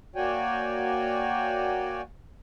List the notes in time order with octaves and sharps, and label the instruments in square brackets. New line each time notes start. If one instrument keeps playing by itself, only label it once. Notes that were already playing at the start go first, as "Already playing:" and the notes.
[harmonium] A#3 F#4 C#5 D5 G5 G#5